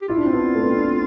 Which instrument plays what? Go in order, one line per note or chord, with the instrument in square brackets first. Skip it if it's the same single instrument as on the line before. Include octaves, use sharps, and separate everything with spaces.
[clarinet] G4
[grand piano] E4 [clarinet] F4
[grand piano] D4
C4
B3 D4
A3
B3
C4
D4
C4 E4